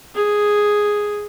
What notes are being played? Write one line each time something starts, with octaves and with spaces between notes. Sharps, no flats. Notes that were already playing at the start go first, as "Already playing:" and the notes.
G#4